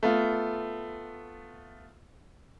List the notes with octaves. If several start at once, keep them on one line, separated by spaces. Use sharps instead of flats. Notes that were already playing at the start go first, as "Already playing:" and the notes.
A3 B3 F4